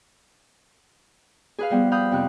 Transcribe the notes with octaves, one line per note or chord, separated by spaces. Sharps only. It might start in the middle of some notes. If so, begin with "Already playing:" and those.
G#4 B4 F5
F3 G3 B3
F5 B5 D#6 G6
F2 C3 F#6